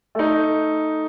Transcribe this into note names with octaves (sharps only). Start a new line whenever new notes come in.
A3 D#4